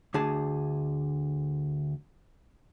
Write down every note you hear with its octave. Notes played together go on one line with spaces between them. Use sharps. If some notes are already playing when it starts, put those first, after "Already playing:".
D2 D4 G#4 A5